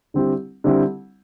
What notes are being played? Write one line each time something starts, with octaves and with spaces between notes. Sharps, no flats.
D3 G3 C4 E4 G4
D3 G3 C4 E4 G4